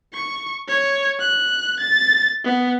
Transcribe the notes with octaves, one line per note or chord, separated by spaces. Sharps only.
C#6
C#5
F#6
A6
B3